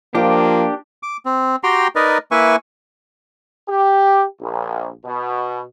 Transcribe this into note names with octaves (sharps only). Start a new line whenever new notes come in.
F3 A#3 D4 F4 G4 C5 D#5
D6
C4
F#4 G4 G5 A#5 C6
D#4 A#4 B4 D5 D#5
A#3 E4 B4 E5 G#5 C#6
G4
A#1
B2